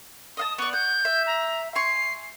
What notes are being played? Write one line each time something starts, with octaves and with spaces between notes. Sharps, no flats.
D#5 F5 A5 D#6
B3 D5 C#6
F#5 G6
E5
A#5
G#5 C6 C#6 C7